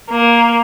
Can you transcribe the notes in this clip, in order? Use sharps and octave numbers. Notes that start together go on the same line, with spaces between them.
A#3